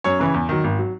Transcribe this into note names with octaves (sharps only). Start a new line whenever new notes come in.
F#2 C#5
C#3 E3
E2
D#3 F#3
G#1
F#3